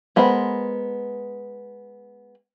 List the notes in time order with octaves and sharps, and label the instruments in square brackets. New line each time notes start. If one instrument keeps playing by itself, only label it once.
[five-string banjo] G#3 B3 A#4 C5 B5